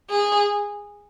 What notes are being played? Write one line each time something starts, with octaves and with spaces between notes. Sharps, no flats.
G#4